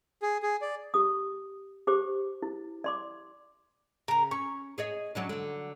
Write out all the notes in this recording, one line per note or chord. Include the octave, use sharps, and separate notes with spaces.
G#4
G#4
D5
G4 D#6
G4 C5 D6
E4
D5 C6 D6
C#3 A#4 A#5
C#4 C#6
G#4 C#5 D#5
F#3 C#4 D4
D3 F#3